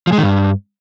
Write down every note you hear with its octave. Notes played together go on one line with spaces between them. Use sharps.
F3
G#3
D#3
G2